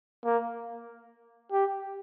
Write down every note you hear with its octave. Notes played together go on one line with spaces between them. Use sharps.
A#3
G4